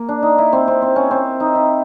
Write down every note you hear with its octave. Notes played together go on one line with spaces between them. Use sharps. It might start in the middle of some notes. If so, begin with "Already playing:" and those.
Already playing: A#3
D4
D#4
E4
C4
C4
C4
C#4
C4
D#4
E4